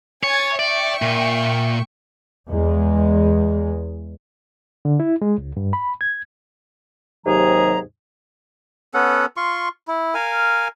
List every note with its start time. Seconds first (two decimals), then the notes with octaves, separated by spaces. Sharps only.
0.23 C#5 G#5 G#6 A6
0.59 D5 E5 G5 C#6
1.02 A#2
2.49 E2 G#3
4.85 D3
5.00 E4
5.22 G#3
5.38 C#2
5.57 G2
5.73 B5
6.01 G#6
7.26 D#2 G#2 C3 F#3 G#4 A#5
8.94 B3 C#4 A4 F#5
9.37 F4 C6 C#6
9.88 E4
10.15 A#4 F5 G#5